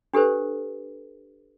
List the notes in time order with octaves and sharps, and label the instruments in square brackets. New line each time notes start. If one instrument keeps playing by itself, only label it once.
[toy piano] D4 G4 A4 B4 C5